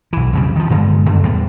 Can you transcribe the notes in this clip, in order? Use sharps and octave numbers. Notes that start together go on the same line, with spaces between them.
B1 E3
F2 C#3 G3
D#3 F3
G2 D3 G#3 B3
F#2 D3 A3
E2 A2 G3 B3